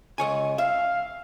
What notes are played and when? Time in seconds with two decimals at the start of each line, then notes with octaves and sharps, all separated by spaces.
0.18 C#2 C#5 G#5
0.58 E5 F5